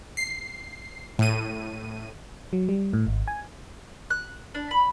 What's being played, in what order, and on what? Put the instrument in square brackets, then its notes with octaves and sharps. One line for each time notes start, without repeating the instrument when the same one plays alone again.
[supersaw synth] C7
A2 D#7
[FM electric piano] F#3
G3
A2
G#1
G#5
[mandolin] F#6
D4
B5